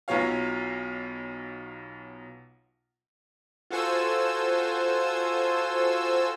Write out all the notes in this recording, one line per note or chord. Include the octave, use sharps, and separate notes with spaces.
B1 B2 F#3 F4 C#5 F5
F4 F#4 A4 C5 G#5 E6